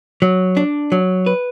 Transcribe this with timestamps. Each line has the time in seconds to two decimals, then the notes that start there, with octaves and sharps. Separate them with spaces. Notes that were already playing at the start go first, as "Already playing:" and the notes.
0.22 F#3
0.57 D4
0.92 F#3
1.26 B4